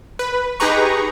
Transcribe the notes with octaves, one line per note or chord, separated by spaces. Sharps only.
B4
D#4 G4 G#4 B4 A#5 C#6